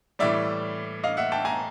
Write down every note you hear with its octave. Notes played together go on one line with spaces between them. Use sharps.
A2 E3 G3 D5 E5
D#5 F5
E5 F#5
G5 A5
G#5 A#5